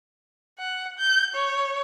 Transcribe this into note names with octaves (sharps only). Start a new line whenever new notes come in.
F#5
G6
C#5